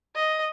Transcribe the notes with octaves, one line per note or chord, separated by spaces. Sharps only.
D#5